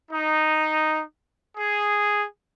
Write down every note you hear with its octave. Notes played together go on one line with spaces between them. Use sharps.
D#4
G#4